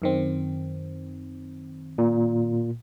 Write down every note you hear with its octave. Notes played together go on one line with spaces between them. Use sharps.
F#2 D#3 C4
A#2